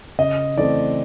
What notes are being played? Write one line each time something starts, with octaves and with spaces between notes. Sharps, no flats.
C#3 D#5
E3 A3 C4 D5